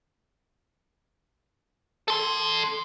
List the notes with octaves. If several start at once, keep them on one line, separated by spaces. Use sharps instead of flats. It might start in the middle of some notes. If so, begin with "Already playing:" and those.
A4 C6